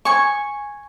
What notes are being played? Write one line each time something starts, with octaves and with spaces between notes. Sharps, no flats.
G#5 C#6